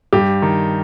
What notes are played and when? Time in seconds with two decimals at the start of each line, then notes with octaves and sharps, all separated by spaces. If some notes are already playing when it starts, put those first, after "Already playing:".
0.13 G2 G4
0.42 D#3